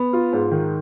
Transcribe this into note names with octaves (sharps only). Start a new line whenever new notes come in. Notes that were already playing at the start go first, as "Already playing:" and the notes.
Already playing: B3
F4
G#2
D#3